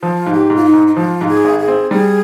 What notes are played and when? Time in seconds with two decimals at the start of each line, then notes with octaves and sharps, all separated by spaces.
0.01 F3 F4
0.26 G#2
0.33 G4
0.50 G#2
0.56 F4
0.65 D#4
0.74 G#2
0.87 D#4
0.96 F3 F4
1.21 G#2
1.28 G#4
1.44 G#1
1.59 G#4
1.68 C4
1.91 G3 G#4